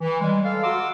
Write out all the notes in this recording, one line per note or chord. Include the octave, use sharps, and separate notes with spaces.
E3
G3 G#3
A4 F5
F#4 F#5 A#5 C6 D6 E6